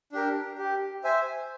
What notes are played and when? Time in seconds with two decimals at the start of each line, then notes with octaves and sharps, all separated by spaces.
0.12 D4 G4 A#4
0.58 G4
1.04 C5 E5 G#5